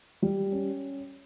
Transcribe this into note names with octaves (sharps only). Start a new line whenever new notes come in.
G3
C#4